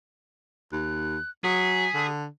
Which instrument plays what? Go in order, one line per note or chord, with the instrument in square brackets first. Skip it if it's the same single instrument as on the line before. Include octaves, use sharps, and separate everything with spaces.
[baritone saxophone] D#2 [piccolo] F#6
[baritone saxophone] F#3 [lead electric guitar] G#4 [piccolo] B6
[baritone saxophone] D3